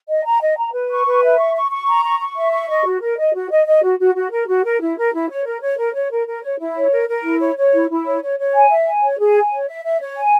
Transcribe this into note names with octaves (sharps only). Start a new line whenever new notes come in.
D#5
A#5
D#5
A#5
B4
C#6
B4
E5
C#6
C#6
C#6
A#5
C#6
C#6
E5
C#6
D#5
F#4
A#4
D#5
F#4
D#5
D#5
F#4
F#4
F#4
A#4
F#4
A#4
E4
A#4
E4
C#5
A#4
C#5
A#4
C#5
A#4
A#4
C#5
E4
C#5
A#4
A#4
E4
C#5
C#5
E4
E4
C#5
C#5
C#5
G#5
E5
G#5
C#5
G#4
G#5
C#5
E5
E5
C#5
G#5